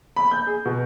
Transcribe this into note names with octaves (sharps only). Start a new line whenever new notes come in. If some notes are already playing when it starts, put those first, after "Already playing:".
B5
G6
G#4
B2